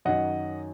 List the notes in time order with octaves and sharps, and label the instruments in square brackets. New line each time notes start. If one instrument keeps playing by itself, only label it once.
[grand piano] F#2 D#3 F#3 D#5 F#5